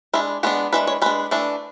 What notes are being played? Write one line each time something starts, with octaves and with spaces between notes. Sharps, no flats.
G#3 D4 E4
G#3 B3 D4 F#4
E3 G#3 D4 B4
C#5
G#3 D4 B4
E3 A3 D4